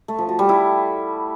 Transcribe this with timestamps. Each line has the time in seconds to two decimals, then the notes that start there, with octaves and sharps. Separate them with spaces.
0.08 A3
0.18 F3
0.29 F#4
0.39 G3
0.49 E4